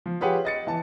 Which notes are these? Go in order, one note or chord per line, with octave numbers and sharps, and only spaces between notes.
F3
F4 G4 G#4 B4 C#5 F#5
D#5 A6 C#7
E3 A5